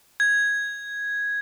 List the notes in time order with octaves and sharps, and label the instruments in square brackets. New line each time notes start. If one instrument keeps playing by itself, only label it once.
[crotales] G#6